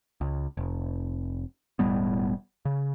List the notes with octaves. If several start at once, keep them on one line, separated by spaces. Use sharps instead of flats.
C#2
F1
E1 A2 G3 B3
C#3